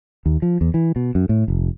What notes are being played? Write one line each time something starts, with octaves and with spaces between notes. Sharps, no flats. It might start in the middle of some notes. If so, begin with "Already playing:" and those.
D#2
F3
E2
E3
B2
F#2
A2
F1